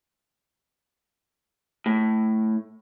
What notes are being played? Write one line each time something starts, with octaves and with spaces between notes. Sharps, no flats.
A2